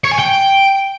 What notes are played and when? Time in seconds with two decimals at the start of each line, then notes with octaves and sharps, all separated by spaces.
0.04 C#5
0.12 G#5
0.19 G5